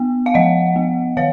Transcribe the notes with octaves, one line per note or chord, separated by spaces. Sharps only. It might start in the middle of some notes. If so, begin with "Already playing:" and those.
Already playing: B3
F5
F3 D#5 F#5
B3
D#3 C#5 F5